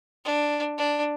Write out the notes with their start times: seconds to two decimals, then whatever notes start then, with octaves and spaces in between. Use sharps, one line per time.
0.25 D4
0.78 D4